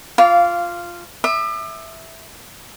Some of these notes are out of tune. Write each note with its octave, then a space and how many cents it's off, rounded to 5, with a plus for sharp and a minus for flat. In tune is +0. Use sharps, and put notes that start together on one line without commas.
F4 +0 F5 -10 D6 -25
E5 -5 D6 +40